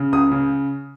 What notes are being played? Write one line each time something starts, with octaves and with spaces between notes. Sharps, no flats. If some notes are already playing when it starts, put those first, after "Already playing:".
Already playing: C#3
C#2 D#6
C#3